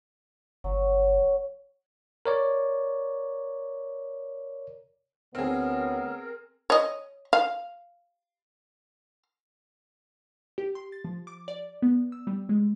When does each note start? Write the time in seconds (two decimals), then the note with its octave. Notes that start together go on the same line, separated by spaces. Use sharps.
0.64 G1 F#3
2.26 A#4 C#5 D5
5.35 D2 B3 C4 G#4 A#4 C#5
6.70 C#5 D#5
7.33 F5
10.58 G4
10.75 C6
10.92 A6
11.04 F3
11.27 D6
11.48 D5
11.82 B3
12.12 E6
12.27 G3
12.49 G#3